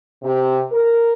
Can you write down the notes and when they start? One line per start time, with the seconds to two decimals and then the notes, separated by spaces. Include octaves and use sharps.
0.24 C3
0.72 A#4